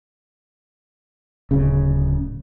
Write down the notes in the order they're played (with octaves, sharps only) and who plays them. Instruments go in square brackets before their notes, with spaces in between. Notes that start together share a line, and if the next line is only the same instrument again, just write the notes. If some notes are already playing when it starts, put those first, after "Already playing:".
[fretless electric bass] D1 C#3